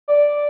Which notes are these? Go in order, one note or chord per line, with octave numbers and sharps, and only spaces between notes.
D5